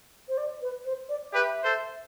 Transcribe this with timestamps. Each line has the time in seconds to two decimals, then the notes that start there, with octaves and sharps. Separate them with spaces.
0.29 C5
0.38 D5
0.62 B4
0.85 C5
1.09 D5
1.32 G4 B4 E5
1.64 A4 C5